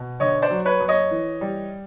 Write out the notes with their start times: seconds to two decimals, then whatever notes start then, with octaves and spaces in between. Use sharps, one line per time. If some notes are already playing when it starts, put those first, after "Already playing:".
Already playing: B2
0.20 D3 C#5 D#5
0.42 C5 D5
0.51 F#3
0.65 B4 C#5
0.80 F#2
0.88 C#5 D#5
1.11 E3
1.41 G3